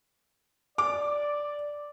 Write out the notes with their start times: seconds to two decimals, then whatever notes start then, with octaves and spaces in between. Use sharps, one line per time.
0.78 D5 D6